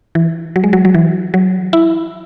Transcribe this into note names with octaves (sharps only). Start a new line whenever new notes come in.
E3
F#3
G#3
F#3
F#3
E3
F#3
E4